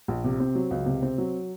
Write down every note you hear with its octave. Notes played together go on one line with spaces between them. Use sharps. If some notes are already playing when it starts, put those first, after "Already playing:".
A#1
C3
C4
F#3
C#2
C3
C4
F#3